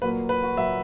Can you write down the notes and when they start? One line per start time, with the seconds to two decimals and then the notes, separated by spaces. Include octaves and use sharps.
0.01 A#2 F#3 A#3 B4
0.29 B4
0.43 F#4
0.57 A#2 F#3 A#3 E5